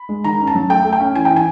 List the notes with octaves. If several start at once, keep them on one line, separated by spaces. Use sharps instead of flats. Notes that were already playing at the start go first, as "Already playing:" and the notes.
Already playing: B5
G#3
D#3 A#5
C#4
A5
F#3
A3 G5
A3
G5
C#4
E3 G#5
E3 G5
G#5